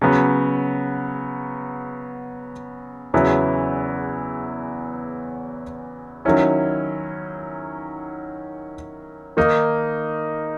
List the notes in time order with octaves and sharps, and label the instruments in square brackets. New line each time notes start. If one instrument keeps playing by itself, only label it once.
[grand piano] C#3 F#3 B3
E2 C#3 F#3 B3 E4
D#3 F#3 C#4 E4
D#3 A#3 D#4